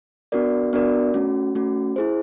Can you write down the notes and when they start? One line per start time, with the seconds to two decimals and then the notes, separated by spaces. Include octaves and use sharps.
0.32 B3 D4 F#4 A#4 D5
0.73 B3 D4 F#4 A#4 D5
1.14 A3 C#4 F#4
1.55 A3 C#4 F#4
1.96 E4 G#4 C5